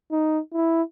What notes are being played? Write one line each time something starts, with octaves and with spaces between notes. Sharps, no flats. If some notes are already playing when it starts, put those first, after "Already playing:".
D#4
E4